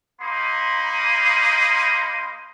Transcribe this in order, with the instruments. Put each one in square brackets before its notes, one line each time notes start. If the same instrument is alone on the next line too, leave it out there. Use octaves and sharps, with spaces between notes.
[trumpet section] A#3 D#4 B5 C6 D#6